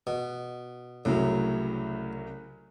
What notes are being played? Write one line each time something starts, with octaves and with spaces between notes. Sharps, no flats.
B2
C2 A2 C#3 F#3